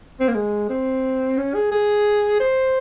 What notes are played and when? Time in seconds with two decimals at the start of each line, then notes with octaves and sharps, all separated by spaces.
0.20 C4
0.28 A#3
0.35 G#3
0.69 C4
1.38 C#4
1.55 G#4
1.72 G#4
2.40 C5